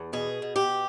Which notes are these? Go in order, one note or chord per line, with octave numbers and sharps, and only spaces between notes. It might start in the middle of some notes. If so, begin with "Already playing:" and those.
Already playing: E2
B2 G#4
B2
G4